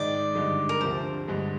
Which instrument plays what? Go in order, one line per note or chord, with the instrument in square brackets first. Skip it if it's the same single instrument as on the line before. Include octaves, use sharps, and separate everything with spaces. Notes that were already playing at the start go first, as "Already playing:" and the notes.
Already playing: [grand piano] G#2 D#3 G#3 D#4 [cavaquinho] D5
[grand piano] G2 D3 G#3 D#4
[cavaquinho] A#4
[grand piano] D2 C3 F3 [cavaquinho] C5
[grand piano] G2 D3 G#3